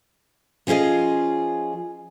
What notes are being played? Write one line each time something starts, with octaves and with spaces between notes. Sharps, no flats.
F3 C#4 F4 G#4 D#5